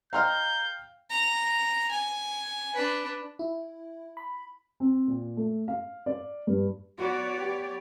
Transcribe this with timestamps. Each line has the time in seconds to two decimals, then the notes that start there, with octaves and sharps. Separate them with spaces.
0.13 A#4 C5 D#5 F5 G5 F6 G6
1.10 A#5
1.91 G#5
2.75 D4 B4
3.39 E4
4.17 B5
4.80 C4
5.08 A#2
5.37 A3
5.68 F5
6.06 D5
6.47 G2
6.98 B3 F#4 C#5 D5
7.40 G4